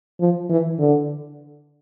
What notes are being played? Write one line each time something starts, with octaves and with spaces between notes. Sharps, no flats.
F3
E3
D3